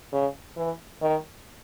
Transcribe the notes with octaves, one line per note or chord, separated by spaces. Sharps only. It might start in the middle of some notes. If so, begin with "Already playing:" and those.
C#3
E3
D#3